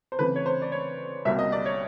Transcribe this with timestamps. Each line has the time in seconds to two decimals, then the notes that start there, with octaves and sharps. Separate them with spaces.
0.12 C5
0.19 C#3 E3 A3 C4 B4
0.36 C#5
0.46 C5
0.62 D5
0.72 C#5
1.25 C2 B2 G3 A#3 E5
1.39 D#5
1.52 D5
1.66 C#5